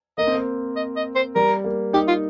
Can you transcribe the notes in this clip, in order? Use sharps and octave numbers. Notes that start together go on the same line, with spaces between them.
A#3 D#5
C4
A#3
D#5
D#5
C5
G3 A#4
A#3
D#4 G4
F4